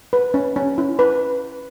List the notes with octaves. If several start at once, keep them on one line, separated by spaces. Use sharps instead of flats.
B4
C#4
C#4
E4
B4